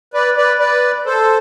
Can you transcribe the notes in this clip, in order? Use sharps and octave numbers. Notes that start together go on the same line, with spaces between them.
B4 D5
B4 D5
B4 D5
A4 C5